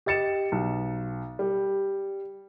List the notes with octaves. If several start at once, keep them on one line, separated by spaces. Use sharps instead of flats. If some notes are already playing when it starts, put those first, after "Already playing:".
G4 D#5 A6 C#7 E7
B1
G3